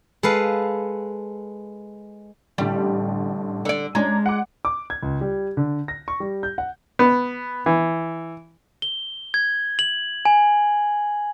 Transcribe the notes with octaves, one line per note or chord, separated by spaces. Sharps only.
G#3 A4 B4 F5
A1 D3 G3
D3 D5
G#3 C#4 D4 A#5
F#5 D6
D6
G#6
C#2
G3
D3
A#6
C#6
G3
G6
F#5
B3
E3
G7
G#6
F#7
G#5